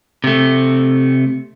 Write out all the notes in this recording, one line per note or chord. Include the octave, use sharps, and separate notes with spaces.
C3 A3